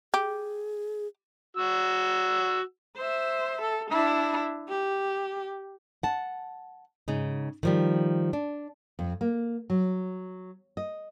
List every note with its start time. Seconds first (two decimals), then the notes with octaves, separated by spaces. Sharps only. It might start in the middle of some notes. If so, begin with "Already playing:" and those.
0.14 G4 G#4
1.57 F#4 E6
2.97 C5 E5
3.62 A4
3.91 D4 E4
4.69 G4
6.03 F#5 A5
7.08 G#2 C#3 D#4
7.63 D#3 F3 G3
8.33 D4
8.99 F2
9.21 A#3
9.70 F#3
10.77 D#5